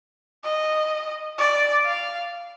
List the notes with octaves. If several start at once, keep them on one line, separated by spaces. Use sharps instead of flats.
D#5
D5
F5